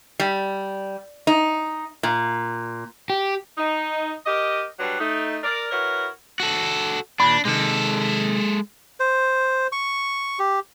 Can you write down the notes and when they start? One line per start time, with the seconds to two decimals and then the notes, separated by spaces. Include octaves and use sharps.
0.20 G3
1.27 D#4
2.03 A#2
3.10 G4
3.58 D#4
4.26 G4 A#4 D#5
4.79 F#3 G3 D4 B4 F#5
5.00 A3 D#4
5.44 A#4 D5
5.71 E4 F#4 A#4 B4 C#5
6.40 F#4 A4
7.20 D#2 A#2 D4 B5
7.45 C3 D#3 G#3 A4
9.00 C5
9.72 C#6
10.39 G4